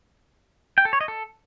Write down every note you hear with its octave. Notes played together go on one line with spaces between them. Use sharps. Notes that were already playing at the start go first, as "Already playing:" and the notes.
G5
A4
C#5
D#5
A4